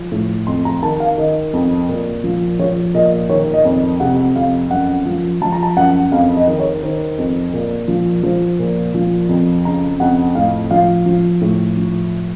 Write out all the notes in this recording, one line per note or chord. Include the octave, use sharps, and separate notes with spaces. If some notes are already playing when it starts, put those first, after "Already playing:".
Already playing: F3
A2
F2 C6
A#5
D#3 A5
F5
D#3 D#5
F2
A#2
F3
F3 C#5
A#2 D#5
D#3 C#5
D#5
F2
C3 F#5
F2 F5
F#2 F#5
F3
F3 A5
A#5
A5
F#2 F#5
F2 F5
D#5
D#3
C#5
D#3 C5
F2
A#2
F3
F3 C5
A#2
F3
F2
C#3 A#5
F2 F#5
A2 F5
F3 F5
F3
A2
F3